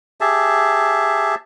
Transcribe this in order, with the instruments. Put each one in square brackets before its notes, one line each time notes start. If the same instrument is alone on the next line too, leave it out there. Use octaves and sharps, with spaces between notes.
[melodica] G4 G#4 E5 A5